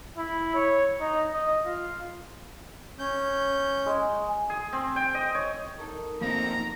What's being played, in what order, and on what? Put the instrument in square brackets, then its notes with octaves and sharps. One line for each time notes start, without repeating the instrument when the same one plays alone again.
[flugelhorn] E4
C#5
D#4
D#5
F4
[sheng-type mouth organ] C#4 G6
[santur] G#3
[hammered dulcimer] G#4
C4
G5
D#5
C#5
[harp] D#4 A4 A#4
[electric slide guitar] F3 C4 D#4 [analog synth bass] A#3 [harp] F5 [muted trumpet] A#5